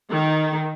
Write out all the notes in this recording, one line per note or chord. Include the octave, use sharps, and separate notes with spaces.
D#3